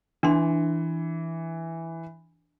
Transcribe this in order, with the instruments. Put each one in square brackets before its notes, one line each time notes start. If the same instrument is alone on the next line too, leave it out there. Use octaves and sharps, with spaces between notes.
[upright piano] E3 [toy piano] D4 C6